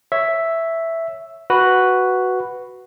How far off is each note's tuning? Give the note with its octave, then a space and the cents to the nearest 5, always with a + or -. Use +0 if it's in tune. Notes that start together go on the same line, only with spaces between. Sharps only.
C#5 +0 E5 +0
F#4 +0 B4 +0